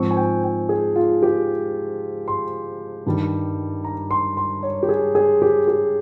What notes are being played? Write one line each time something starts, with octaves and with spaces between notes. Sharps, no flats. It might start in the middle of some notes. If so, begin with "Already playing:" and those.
Already playing: G#2 F3 C4 C#6
G#5
G5
G5
G#4
F4
G4
C6
G2 D#3 G3
A#5
C6
C6
C#5
G4
G#4
G#4
G4
G4